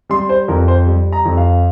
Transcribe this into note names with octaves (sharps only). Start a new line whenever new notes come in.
G3 C6
C5
F2 A#4
C5
G3
A#5
F2
F5